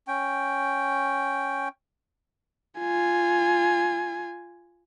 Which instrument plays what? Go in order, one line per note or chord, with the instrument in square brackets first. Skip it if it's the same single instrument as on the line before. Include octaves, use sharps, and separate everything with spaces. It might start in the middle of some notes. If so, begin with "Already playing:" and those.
[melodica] C#4 G5
[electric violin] F4 G#5